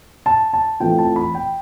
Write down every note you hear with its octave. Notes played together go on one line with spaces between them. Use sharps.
A5
A5
E3 A3 C4 F4 G5
A5
B5
G5